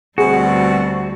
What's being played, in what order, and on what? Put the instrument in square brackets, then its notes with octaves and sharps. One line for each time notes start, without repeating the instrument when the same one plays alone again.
[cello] D2 G3 [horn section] B2 C4 [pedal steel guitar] F#4 [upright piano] G#4